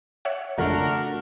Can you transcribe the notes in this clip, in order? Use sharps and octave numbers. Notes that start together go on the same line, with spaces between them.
C#5 E5 F#5
G#1 F2 C#3 A3 D4 F#4 A#4